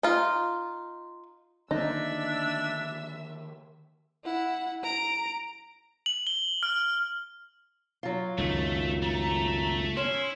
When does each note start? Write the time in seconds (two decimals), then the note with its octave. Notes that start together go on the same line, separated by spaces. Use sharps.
0.03 D#4 F4
1.71 D3 D#3 A#3 D4 D#4 E5 E6
4.24 E4 F#5
4.84 A#5 D7
6.06 F#7
6.27 G7
6.63 F6
8.03 F#3 F4
8.38 C#2 F#2 D#3 A3
9.02 A3 A#5
9.97 C#4 E4 C6